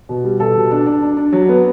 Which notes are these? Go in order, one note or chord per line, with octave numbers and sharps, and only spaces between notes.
B2
G3
B2 A4
B2
D4
D4
D4
D4
F#3
B3